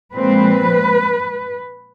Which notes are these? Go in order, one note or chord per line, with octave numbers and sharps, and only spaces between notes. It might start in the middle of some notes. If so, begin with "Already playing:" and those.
A#2 F3 G#3 C4 B4